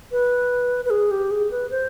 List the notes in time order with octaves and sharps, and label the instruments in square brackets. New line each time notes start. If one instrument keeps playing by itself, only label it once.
[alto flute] B4
B4
G#4
G4
G#4
B4
C5